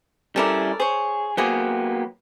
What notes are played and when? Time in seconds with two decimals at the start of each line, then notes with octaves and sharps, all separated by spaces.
0.36 G3 C#4 E4 A4 A#4 D5
0.80 G#4 C5 C#5
1.37 F#3 A#3 B3 G4 G#4 C5